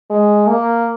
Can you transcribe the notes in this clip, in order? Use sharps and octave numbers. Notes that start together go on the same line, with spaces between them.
G#3
A#3